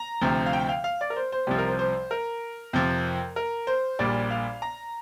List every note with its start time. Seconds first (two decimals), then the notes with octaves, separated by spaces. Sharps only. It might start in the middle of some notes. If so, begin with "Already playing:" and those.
Already playing: A#5
0.21 D2 C3 F3
0.46 F5
0.53 G5
0.69 F5
0.84 F5
1.01 D5
1.10 A#4
1.16 C5
1.32 C5
1.47 C2 C3 F3 G4
1.58 A#4
1.68 C5
1.79 C5
2.11 A#4
2.73 F2 C3 F3
3.36 A#4
3.67 C5
3.99 A#1 A#2 G3 D5
4.31 F5
4.62 A#5